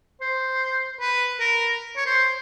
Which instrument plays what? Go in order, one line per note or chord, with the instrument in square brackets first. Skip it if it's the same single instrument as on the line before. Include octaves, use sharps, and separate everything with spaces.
[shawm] C5
B4
A#4
C#5
C5